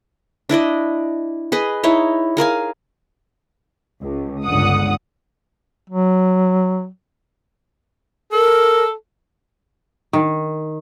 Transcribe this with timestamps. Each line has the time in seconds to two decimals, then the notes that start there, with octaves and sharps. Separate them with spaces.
0.49 D4 E4 D5 D#5
1.52 G#4 B4 D#5
1.83 D#4 E4 C#5
2.37 G#4 A#4 F5 G#5
4.03 C#2
4.45 G1 C#2 D3 F#5 D#6
5.90 F#3
8.33 A4 A#4
10.13 D#3